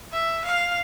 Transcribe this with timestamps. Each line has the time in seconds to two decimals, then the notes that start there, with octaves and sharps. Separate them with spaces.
0.12 E5
0.45 F5